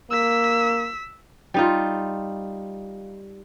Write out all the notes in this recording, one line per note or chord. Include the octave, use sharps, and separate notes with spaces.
A#3 E6 B6
G3 D#4 F4